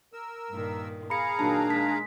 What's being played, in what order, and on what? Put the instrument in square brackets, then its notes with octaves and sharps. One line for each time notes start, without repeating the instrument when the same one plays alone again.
[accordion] A#4 E6
[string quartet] G2 A#2 D#3
[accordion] G#4 F5 A#5 [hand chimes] B5 C#7
[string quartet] A#2 D#3 F#3 [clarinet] D4 [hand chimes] A5
[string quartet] G#3 [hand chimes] B6